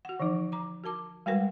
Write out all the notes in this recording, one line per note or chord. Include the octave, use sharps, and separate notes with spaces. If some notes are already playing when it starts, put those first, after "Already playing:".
F#4 F#5
D3 E3 F3 D#4
A#5 D6
F#4 A#4 A5 D6
G3 G#3 F#4 A#4 B4 F#5